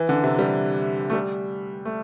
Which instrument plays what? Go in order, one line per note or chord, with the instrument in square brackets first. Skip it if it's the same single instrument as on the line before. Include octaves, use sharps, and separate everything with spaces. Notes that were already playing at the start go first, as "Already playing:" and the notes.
Already playing: [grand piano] E3
D3
C3
G3
A3
G3
A3